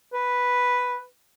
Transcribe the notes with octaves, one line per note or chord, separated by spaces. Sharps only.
B4